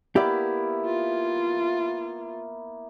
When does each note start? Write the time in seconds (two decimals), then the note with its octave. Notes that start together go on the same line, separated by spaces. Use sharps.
0.16 A#3 B3 E4 G4 D5
0.85 F4